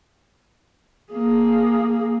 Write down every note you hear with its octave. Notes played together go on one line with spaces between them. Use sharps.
A#3 G#4